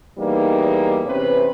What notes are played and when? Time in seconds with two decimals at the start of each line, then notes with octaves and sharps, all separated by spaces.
0.18 E2 G3 A#3 D#4
1.06 E2 C3 C#4 B4